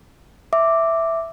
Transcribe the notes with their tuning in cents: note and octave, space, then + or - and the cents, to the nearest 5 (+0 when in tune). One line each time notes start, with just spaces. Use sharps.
E5 +0 D6 +0